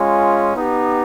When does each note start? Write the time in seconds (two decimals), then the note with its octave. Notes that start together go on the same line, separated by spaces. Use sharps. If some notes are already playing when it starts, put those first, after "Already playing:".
Already playing: G#3 C#4 F4
0.54 B3 D#4 G4